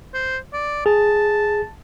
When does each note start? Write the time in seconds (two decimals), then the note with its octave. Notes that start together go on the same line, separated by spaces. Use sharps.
0.14 C5
0.53 D5
0.86 G#4 A5